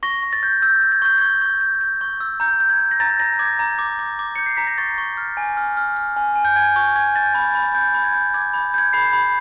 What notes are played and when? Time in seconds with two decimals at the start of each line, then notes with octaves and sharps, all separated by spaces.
0.03 C#6 A#6
0.23 C#6
0.33 A6
0.43 G6
0.62 E6 G6
0.82 G6
0.92 G#6
1.02 C#6 G6
1.18 C#6 G#6
1.42 C#6
1.61 G6
1.81 G6
2.01 C#6
2.20 E6
2.40 A#5 G6
2.60 G6
2.70 G#6
2.80 G6
2.91 A#6
3.00 A#5 A6
3.20 A#5 A#6
3.39 D6 G#6
3.59 A#5
3.79 D6
3.99 D6
4.19 D6
4.36 G6 C#7
4.46 C7
4.57 A#5 B6
4.67 A#6
4.78 C#6 A6
4.98 C#6
5.17 F6
5.37 G#5
5.57 F6
5.77 F6
5.97 F6
6.16 G#5
6.36 G#5
6.45 G6
6.56 G#5 G#6
6.76 C#6
6.96 G#5 G#6
7.15 G6 A6
7.33 B5 A6
7.45 G#6
7.55 B5
7.75 G6
7.94 B5
8.04 G#6
8.14 G6
8.34 D6 G#6
8.54 B5
8.74 G6 G#6
8.93 B5 C7
9.13 B5